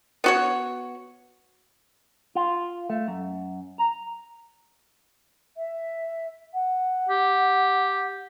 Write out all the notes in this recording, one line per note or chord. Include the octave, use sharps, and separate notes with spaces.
B3 F#4 C#5
F4
A3
F#2
A#5
E5
F#5
G4